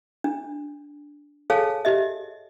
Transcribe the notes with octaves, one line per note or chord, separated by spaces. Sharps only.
D4
G#4 A4 C#5 F5 G#5 A5
G4 D#5 E5